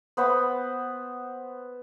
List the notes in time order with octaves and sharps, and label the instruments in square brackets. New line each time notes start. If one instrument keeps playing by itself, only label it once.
[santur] B3 C5 F#5 B5